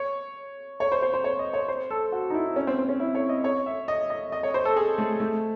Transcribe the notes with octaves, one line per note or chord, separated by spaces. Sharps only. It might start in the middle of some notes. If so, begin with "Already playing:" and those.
Already playing: C#5
C#5
C5
C5
C5
C#5
D#5
C#5
C5
A4
F#4
D#4
E4
C#4
C4
C4
C#4
E4
C#5
D#5
C#5
E5
D#5
D#5
D#5
C#5
C5
A4
G#4
A3
A3